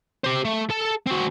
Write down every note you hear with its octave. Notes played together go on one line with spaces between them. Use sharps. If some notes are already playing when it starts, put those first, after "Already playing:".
G4 C5
A3
A4 A5
C4 F#4